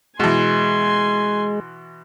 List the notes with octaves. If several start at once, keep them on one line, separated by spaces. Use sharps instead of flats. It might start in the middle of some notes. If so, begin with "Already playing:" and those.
B2 E3 G#3 G#5 C6